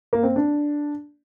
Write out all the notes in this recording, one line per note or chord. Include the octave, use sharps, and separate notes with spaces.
A#3
C4
D4